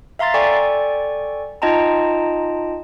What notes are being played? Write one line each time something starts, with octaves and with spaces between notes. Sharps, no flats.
E5 F5 A#5 C6 A6
A4 D5 G5 G#5 C#6
D#4 F4 D#5 G5 A5 A#5